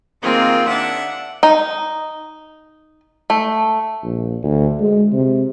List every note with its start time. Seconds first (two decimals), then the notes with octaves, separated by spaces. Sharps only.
0.22 D#3 A#3 C4 F4 G#4
0.68 D4 E5 F#5
1.43 D#4
3.30 A3
4.03 A#1
4.43 D2
4.80 G#3
5.12 C3